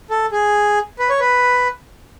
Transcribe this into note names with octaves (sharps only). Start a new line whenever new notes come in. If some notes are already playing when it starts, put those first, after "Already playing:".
A4
G#4
B4
C#5
B4